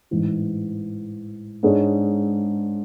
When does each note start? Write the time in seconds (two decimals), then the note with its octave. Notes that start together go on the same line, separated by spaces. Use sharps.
0.11 A1 G#2 E3
1.63 G#2 G#3 D4 G#4 C#5